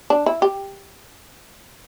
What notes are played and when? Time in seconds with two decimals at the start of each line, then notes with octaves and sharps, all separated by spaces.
0.10 D4
0.26 E4
0.42 G4